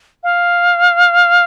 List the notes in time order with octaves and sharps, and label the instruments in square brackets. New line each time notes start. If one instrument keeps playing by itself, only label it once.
[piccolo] F5